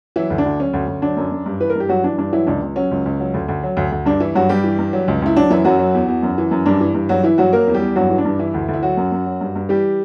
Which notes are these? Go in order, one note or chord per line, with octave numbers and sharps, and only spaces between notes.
E3 F#3 E4
D2
D4
D2
F#3 C#4
D2
D2
F#3 D4
F#2
F#2
G2
E3 B4
A#4
G2
G4
G2 F#3 F#4
E3 D4
G2 D4
E3 F#3 E4
C#2 D4
C#2
F#3 C#4
C#2
C#2
F#3
D2
D2
F#3
D2
D2
G2 D4
E3 E4
G2 F#3 F#4
G2 G3 G4
E3
G2
F#3
C#2
C#2 E4
F#3 D4
F#2 E3 E4
F#2 F#3 F#4
F#3
E2
E2
F#2
E3
F#2
G2 D4
E3
G2
G2 F#3 F#4
E3 E4
G2 F#3 F#4
F#3 A#3 A#4
E2
G3 G4
E2
G2 F#3 F#4
E3
D4
G2
E3 E4
D2
D2
E4
F#3 F#4
F#2
F#2
F#3
G2
G2
E3 G3 G4